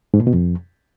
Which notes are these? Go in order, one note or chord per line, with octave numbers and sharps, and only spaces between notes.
G#2
A#2
B2
F2